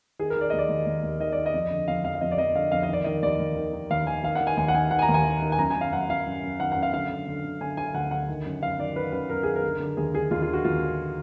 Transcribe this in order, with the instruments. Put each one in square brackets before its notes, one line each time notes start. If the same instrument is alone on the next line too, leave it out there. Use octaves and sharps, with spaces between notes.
[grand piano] D#3 G#4
A#4
D#3 D5
D#2 D#5
D5
D#2
D#2
D#2
D#3 D#5
D#3 D5
D#5
F2
D3
F2 F5
F2 F5
F5
F2 D#5
D5
F2 D#5
D3 F5
F2 F5
D#5
D#3 D5
D#3 D#5
D#2 D5
D#2
D#3
D#3
D#2 F5
D#3 G#5
D#3 F5
F#5
D#3
G#5
D#2 G#5
F#5
D#3 G#5
D#3 F#5
G#5
A#5
D#2
G#5
D#3
D#3
G#5
F#2 A#5
G#5
F#2
F5
F#2 F#5
F#2 F5
F#2
F#2
D#3 F#5
F#5
F#2
F5
D3 F5
D3
D3
D3
D3 G#5
D3 G#5
D2 F#5
D3 F#5
D#3
F#2
F#2 F5
D#3 D5
D#3 B4
F#2 B4
F#2 A#4
D#3 G#4
A#4
D3
D3
D#2 G#4
D3 G#4
D#2 F4
F4
D3
F#4
D#2 F4
D3